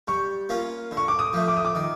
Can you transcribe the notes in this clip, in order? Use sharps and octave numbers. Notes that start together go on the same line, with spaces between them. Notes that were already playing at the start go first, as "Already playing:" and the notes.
G3 C#6
A#3 C#4 F4
D3
C#6
D6
D#6
F3 A3
D6
D#6
D6
D#3